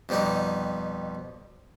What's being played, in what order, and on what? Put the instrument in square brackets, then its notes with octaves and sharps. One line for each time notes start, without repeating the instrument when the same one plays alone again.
[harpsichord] F2 B2 G3 D#4 F#5